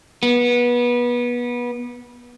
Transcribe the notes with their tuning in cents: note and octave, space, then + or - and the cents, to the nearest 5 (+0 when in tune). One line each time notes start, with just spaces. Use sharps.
B3 -25